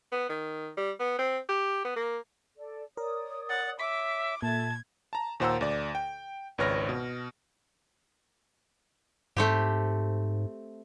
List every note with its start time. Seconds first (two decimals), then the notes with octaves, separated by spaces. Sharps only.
0.12 B3
0.29 D#3
0.77 G3
1.00 B3
1.19 C4
1.49 G4
1.85 B3
1.96 A#3
2.58 A4 D5
2.97 A#4 C#5 D5 D#6
3.49 F#5 A6
3.79 C#5 E5 D6 B6
4.42 A#2 A4 E5 A5 G#6
5.13 A5 A#5
5.40 D#2 A#2 C5 F#5 A#5 E6
5.61 D2 D5
5.95 G5
6.58 G#1 C#2 B4 C#5 F6 A#6
6.89 B2
9.37 G#2 A3 C4 G4